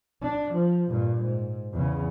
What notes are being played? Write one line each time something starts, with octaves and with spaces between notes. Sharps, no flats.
D4
F3
G2 A#2
G#2
E2 C#3